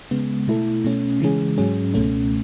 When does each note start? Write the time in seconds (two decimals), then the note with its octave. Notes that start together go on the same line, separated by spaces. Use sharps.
0.11 C#3 G#3 B3
0.47 B2 A3 E4 A4
0.84 B2 A3 C#4
1.20 C#3 E3 G#3 C#4 G#4
1.58 G#2 F#3 C#4 G#4
1.94 C#2 B2 A3 C#4